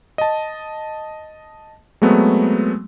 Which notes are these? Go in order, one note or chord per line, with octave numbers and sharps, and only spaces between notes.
D#5 A5
F#3 G#3 A3 B3 C4